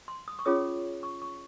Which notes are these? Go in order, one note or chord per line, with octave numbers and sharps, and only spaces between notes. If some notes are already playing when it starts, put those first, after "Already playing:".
C6
D#6
C#6
C#4 F4 G#4 C#5 D#6
C#6
C#6